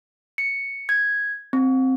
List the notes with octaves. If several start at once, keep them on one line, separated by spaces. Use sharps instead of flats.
C#7
G#6
C4